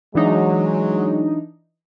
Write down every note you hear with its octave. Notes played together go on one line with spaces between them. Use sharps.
E3 F#3 G#3 D4 D#4